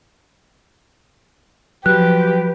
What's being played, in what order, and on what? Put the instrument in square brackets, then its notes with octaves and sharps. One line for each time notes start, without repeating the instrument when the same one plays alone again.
[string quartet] F3 G4 [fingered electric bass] F#3 [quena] B4 [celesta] F#6